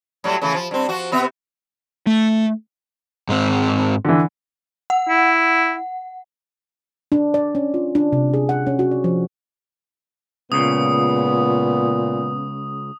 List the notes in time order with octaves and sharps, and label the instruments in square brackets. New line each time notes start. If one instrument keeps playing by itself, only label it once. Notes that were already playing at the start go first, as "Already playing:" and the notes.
[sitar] A2 F#3 G3
C#3 E3 A3
F3
G2 C4
F3 F#4
C3 B3 E5
[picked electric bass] A3
[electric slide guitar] G#2 G#3 C4
[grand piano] D3 E3
[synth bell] F#5
[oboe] E4
[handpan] D4
D5
C#4
F4
D4
C3
G#4
F#5
C#4
F#4
D5
F3
[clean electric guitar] C#2 C#3 [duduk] A#2 [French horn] B3 [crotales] D#6